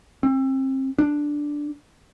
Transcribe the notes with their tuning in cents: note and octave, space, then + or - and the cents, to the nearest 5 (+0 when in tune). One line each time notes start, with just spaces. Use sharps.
C4 +30
D4 +0